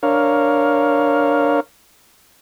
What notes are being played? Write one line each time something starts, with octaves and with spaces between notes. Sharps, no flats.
D4 A#4 C#5 F5